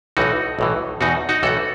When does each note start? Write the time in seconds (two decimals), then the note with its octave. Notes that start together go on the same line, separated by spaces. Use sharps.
0.17 B1 A2 E3 D#4 F#4
0.59 B1 A2 E3
1.01 E2 B2 D#4 F#4
1.29 D#4 F#4
1.43 B1 A2 E3 F#4 A4